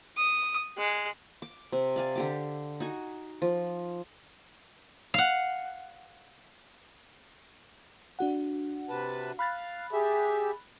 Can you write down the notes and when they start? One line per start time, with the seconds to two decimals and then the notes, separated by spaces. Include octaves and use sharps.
0.17 D#6
0.77 G#3 F#6
1.42 D6
1.72 C3
1.96 D5 F5 G#5
2.15 D3 G4 D6
2.80 D#4 F#4 G#5
3.42 F3
5.14 F5 F#5
8.19 D4 F#4 F#5
8.89 C3 B4 A5
9.39 F5 B5 F#6 A6
9.93 G4 G#4 E5